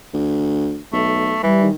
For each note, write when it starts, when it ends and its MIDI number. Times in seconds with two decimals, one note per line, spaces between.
0.14 0.79 38
0.93 1.39 35
0.93 1.38 57
1.43 1.67 52
1.43 1.69 55
1.62 1.75 51